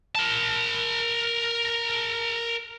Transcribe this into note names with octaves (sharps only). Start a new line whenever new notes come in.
A#4 A5